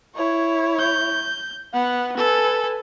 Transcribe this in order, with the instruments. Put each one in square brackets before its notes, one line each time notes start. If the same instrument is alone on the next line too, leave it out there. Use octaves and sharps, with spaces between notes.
[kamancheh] E4 C#5
[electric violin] G6
[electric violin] B3 [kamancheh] F#5
[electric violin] A4 [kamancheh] B4 G#5